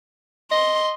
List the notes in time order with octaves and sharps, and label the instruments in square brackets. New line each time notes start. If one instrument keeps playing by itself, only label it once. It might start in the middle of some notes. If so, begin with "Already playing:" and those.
[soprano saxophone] D#5 [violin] C6